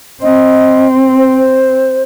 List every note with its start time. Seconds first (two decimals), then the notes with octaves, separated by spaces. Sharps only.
0.23 C4 D#5
1.17 C5